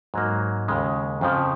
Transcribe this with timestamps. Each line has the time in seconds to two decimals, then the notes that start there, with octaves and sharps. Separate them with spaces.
0.14 G#2 F#3 A#3
0.68 D#2 C#3 G#3
1.21 F2 C#3 F3